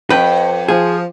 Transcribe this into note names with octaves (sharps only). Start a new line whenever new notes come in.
F2 B4 G5
F3 G#4